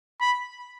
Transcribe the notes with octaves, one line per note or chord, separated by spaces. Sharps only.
B5